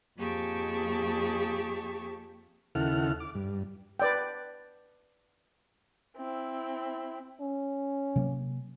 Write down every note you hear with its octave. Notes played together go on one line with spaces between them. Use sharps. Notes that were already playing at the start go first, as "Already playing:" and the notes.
F2 A#3 G4 G#4 A5 C#6
D#2 C#3 E4 A4 F#5 F6
D6
G2
B4 D5 G5
C4 E4
C#4
C3 F#3 A#3